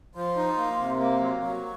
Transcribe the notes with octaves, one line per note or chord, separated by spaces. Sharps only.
F3 C6
D#4
A#3
C3
A#3
F#3
F#3 C#6